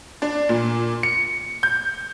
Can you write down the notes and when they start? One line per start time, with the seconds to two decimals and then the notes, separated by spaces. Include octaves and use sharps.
0.22 D4
0.49 A#2
1.03 C#7
1.63 G6